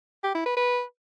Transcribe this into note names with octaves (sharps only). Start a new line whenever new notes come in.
G4
E4
B4
B4